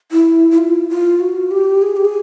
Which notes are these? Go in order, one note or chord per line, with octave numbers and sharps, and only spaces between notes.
E4
E4
F4
F4
F#4
G4
G#4
G4
G#4